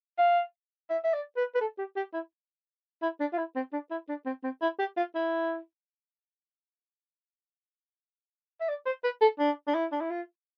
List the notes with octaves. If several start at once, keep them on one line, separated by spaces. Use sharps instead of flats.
F5
E5
E5
D5
B4
B4
A4
G4
G4
E4
E4
D4
F4
E4
C4
D4
E4
D4
C4
C4
E4
G4
F4
E4
E5
D5
C5
B4
A4
D4
D4
E4
D4
E4
F4